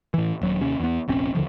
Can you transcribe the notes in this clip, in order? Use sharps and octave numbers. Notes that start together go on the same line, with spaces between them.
A2 E3
D#1 F#3
D#2 C3 C#4
E2 B3
F1 A#1 C4 C#4
D#2 D3 F3